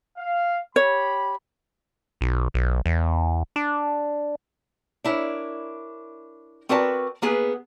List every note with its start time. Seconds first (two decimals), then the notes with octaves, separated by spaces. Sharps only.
0.18 F5
0.76 G4 C#5 B5
2.21 B1
2.54 B1
2.86 E2
3.56 D4
5.04 D4 E4 A#4 C#5
6.69 C4 F#4 A#4 B4 D5 A5
7.22 A#3 B3 G#4 B4